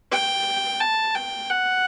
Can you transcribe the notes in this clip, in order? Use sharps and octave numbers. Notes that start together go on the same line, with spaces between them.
G5
A5
G5
F#5